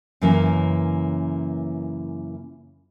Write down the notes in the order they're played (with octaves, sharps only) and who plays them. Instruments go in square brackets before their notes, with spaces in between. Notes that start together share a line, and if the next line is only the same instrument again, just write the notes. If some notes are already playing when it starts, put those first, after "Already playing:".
[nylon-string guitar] F#2 C#3 E3 A#3 E4 B4